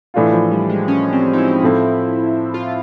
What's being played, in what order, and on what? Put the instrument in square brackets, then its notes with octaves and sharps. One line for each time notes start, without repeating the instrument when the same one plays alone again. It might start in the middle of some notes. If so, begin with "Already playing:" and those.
[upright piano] A2 E3 A3 D4 F4
[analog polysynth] F3
G3
G#3
C#4
C4
D#4
E4
[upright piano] A2 F3 A3 C4
[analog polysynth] F4